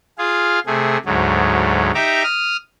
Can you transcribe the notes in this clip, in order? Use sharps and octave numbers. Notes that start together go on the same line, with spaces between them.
F4 G#4 F5
C3 A3 G#4
D2 G#2 F#3
D#4 G4 E5 A#5 D6
D#6 F6